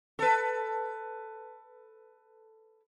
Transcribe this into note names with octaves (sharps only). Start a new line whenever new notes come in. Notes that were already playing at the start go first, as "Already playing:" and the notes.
A4 B4